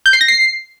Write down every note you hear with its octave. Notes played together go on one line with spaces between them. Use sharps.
G6
C7
A#6
C7